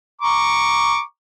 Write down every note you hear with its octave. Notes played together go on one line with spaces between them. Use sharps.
A#5 C#6 D6